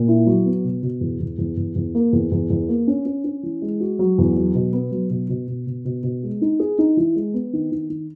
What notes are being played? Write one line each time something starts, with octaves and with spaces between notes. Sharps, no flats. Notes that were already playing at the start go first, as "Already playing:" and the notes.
Already playing: A#2
E4
F#3
B3
B2
B2
E2
E2
E2
E2
E2
A#3
E2
E2
E2
A#3
C#4
C#4
C#4
E3
G#3
F#4
F#3
E2
F#3
B2
B3
F#3
B2
B2
B2
B2
B2
B2
G#3
D#4
G#4
D#4
E3
G#3
B3
D#3
D#3
D#3